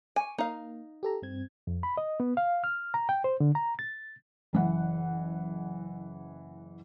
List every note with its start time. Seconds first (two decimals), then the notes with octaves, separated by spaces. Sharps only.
0.16 G#5 C#6 D6
0.38 A#3 D#4 F5
1.03 G4 A4 A#5
1.22 G2 C4 G#6
1.67 F2
1.83 B5
1.97 D#5
2.20 B3
2.37 F5
2.64 F6
2.94 A#5
3.09 G5
3.24 C5
3.40 D3
3.55 A#5
3.79 A6
4.53 F#1 E3 F#5